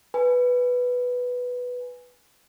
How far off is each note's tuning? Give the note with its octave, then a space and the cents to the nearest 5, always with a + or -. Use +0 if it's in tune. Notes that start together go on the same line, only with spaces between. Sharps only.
B4 +0 G#5 +0